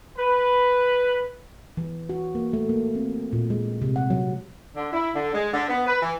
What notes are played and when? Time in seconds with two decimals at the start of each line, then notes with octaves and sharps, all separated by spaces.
0.18 B4
1.77 E3
2.09 F#4
2.35 A#3
2.53 A3
2.69 A#3
2.95 C4
3.33 A#2
3.50 G#3
3.82 C3
3.96 F#5
4.10 F#3
4.75 D3
4.92 E4
5.14 D3
5.33 G#3
5.53 D3
5.68 B3
5.86 B4
6.01 E3